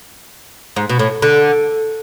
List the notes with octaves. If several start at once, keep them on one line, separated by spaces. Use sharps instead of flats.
G#2
B2
A2
D3